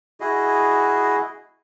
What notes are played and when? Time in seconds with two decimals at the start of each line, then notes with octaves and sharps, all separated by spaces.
0.20 E4 F#4 G#4 D#5